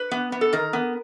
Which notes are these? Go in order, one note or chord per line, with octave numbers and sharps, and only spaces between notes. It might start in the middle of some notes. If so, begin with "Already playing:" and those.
Already playing: B4
B3
B3
A4
D#3 A#4
B3